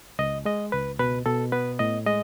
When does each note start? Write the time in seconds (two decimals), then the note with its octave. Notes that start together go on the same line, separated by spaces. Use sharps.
0.19 C#2 D#5
0.45 G#3 D#5
0.72 C#2 B4
0.99 B2 B4
1.26 B2 A4
1.52 B3 B4
1.79 A2 D#5
2.06 G#3 D#5